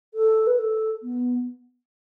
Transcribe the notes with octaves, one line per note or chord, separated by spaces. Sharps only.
A4
B4
A4
B3